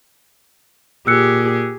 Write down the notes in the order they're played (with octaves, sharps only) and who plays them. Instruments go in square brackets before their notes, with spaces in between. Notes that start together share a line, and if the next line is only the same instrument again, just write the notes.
[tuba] A#2 [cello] G4 G#4 [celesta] E6 F#6 C#7